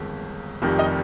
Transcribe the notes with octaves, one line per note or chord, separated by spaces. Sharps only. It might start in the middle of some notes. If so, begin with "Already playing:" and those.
Already playing: G1 F2 D#3 G#3
F1 F2 D#3 G3
D#5 G5